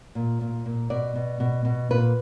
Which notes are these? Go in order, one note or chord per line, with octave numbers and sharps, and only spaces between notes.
A#2
A#2
A#2
B2 D5
B2
B2
B2
A#2 B4